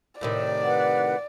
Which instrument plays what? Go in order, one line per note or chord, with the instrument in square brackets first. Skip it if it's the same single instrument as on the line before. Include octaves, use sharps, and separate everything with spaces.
[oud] A2 C3 D#3 [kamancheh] D5
[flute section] B4 F#5